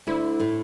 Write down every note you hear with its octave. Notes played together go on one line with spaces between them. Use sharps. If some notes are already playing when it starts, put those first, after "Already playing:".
D2 D3 E4
A2 A3